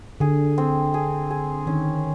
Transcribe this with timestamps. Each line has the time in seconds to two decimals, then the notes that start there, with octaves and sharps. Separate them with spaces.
0.20 D3 G#4
0.58 C4
0.94 G#4
1.30 G#4
1.67 D#3 C#4